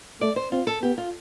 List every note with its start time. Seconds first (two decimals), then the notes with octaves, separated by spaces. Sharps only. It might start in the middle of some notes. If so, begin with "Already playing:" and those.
0.21 A3 D5
0.36 C5
0.51 C4 F4
0.67 A4
0.82 B3 G4
0.98 F4